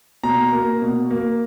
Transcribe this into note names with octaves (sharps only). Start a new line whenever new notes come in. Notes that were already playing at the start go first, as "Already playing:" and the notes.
B2 A#5
A#3
B2
A#3